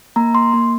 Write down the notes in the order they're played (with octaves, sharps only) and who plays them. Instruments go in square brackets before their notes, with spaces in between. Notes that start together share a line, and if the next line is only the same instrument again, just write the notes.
[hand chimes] A#3 A#5
C6
A#3